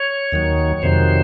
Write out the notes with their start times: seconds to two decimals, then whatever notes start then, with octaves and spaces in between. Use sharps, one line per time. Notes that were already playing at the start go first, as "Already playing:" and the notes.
Already playing: C#5
0.32 D#2 D#3 F#3
0.82 F2 C3 D#3 F#3 C5